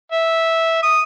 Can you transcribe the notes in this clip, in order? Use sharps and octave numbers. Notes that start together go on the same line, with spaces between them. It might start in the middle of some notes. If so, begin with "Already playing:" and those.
E5
D#6